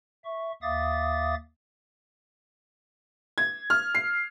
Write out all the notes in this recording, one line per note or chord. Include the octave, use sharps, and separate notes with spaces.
E5 C#6
D#2 E5 F5 D6 D#6 A6
G#6
F6
C7